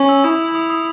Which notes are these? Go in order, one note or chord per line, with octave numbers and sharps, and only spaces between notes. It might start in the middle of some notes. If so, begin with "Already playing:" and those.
Already playing: C#4
E6
E4 D#6
D#6
D#6